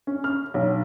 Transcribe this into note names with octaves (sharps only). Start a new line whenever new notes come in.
C#4
F6
B1